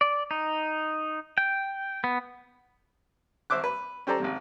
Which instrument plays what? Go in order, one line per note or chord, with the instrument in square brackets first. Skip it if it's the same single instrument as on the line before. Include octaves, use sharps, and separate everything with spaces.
[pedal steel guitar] D5
D#4
G5
B3
[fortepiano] G#1 C5 E5 D6 F#6
B4
C#4 G4 A4 C5 D5 A#5
G#1 F2 C3